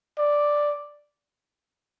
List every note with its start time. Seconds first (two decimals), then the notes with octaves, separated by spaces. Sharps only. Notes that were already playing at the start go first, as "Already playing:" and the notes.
0.18 D5